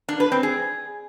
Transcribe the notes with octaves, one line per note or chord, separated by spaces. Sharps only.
D4
B4
C4
G#4